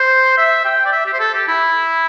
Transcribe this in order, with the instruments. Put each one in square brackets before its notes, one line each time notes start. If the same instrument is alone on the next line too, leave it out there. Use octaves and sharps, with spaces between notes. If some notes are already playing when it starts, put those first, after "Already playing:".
Already playing: [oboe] C5
E5
G5
D5
E5
G4
C5
A4
G4
E4